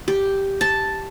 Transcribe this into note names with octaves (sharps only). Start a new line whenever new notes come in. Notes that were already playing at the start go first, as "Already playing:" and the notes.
G4
A5